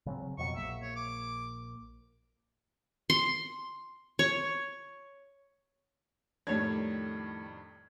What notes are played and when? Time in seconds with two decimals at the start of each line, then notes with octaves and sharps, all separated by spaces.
0.06 C#3 F#3 C4
0.38 F2 B2 F#3 C#6
0.55 A#1 A#3 E5
0.82 C#5
0.96 D6
3.10 C6
4.19 C#5
6.47 F2 A2 D#3 G3 D4 C#5 G#6